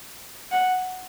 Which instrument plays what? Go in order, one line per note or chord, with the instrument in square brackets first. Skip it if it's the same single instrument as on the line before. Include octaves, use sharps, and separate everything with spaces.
[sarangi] F#5